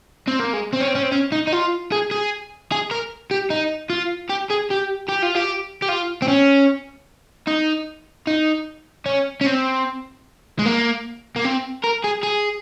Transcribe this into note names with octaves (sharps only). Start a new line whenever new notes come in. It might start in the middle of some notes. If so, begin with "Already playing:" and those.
C4
A#3
G#3
C4
C#4
C4
C#4
C4
C#4
D#4
D#4
F4
G#4
G#4
G#4
A#4
G4
D#4
F4
G4
G#4
G4
G4
F4
G4
G4
F4
C4
C#4
D#4
D#4
C#4
C#4
C4
G#3
A#3
A#3
C4
A#4
G#4
G#4